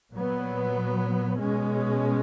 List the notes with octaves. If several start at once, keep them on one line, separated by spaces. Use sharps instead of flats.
A#2 F#3 B3
B2 G#3 C#4